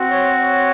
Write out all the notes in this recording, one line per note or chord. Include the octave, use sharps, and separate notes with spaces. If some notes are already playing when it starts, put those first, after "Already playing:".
Already playing: C4 F#4
C#5
C#5